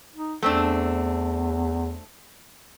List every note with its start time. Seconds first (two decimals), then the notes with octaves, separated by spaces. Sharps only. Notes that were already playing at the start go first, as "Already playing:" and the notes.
0.15 D#4
0.42 E2 A3 C4 D4